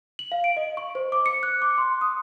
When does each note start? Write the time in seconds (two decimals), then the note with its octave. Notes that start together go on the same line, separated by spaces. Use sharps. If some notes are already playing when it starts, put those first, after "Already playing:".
0.19 F#7
0.32 F5
0.44 D7
0.57 D#5
0.77 C#6
0.95 C5
1.12 D6
1.26 C#7
1.43 F#6
1.62 D6
1.78 C6
2.01 D#6